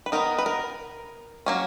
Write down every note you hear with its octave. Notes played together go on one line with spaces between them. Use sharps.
B4
D#3 F#3 B3 D#4 A#4
B4
A#4
F#3 A#3 C#4